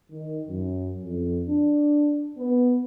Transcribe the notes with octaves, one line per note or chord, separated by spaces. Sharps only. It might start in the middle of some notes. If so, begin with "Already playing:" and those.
D#3
F#2
F2
D4
B3